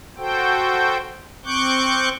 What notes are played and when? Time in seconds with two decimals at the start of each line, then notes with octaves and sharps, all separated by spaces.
0.18 F#4 A4 C5 G5
1.45 C4 C#6 D6 F#6 G6